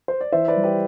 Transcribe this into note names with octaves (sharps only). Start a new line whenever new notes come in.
C5
D5
E3 C5 E5
B4 D5
G3
G4 B4